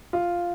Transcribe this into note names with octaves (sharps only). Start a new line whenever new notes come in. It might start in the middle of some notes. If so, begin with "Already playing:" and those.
F4